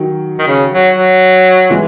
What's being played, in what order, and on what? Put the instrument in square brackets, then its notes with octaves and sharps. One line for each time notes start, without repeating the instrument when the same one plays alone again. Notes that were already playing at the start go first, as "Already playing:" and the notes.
Already playing: [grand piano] D#3 F#3
[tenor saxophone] D#3
C#3
F#3
F#3
[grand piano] E3 G#3